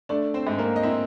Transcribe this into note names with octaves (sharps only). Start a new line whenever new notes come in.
A3 D4 D5
C4 C5
G#2
A#3 A#4
D#5
C4 E4 E5